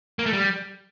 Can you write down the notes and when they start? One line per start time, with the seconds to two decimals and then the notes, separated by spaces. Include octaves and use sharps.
0.19 A#3
0.26 A3
0.33 G3